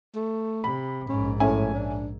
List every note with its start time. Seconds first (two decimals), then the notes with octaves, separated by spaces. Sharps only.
0.15 A3
0.64 C3 B5
1.09 A#1 G#2 C#4
1.40 A2 C#4 E5 G#5
1.74 D4